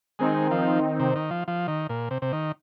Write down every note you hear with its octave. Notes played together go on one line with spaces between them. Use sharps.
D#3 G#3 C4 D#4
F3
C3
D#3
F3
F3
D#3
A#2
C3
C3
D#3